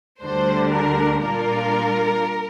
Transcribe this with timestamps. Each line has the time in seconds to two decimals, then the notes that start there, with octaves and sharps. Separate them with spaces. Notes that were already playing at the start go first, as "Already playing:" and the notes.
0.23 D2 D3 G3 D4 C5
0.73 A#4
1.23 A#2 G3 A#3 D4 F4 A#4